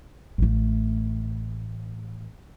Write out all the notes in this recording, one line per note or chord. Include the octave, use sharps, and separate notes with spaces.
A1 A3